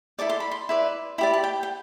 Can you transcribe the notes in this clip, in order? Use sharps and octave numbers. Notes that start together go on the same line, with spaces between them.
E4 A4 D5 D6
C6
B5
C6
E4 B4 D5
E4 G4 D5 B5
A5
G5
G5